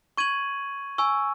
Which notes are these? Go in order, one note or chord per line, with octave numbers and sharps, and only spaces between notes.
C#6 G#6 D#7 F#7
G#5 C#6 E6